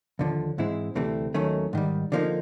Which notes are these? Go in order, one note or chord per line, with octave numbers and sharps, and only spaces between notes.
D#2 D3 F3
G#2 E3 G#3 C4 E4
D2 C3 E3 A3 C4
D#2 D#3 F#3 A3 C#4
G#2 D#3 G3
D3 F3 A#3 D#4